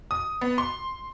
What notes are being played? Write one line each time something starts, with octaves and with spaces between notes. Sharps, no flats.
D#6
B3
C6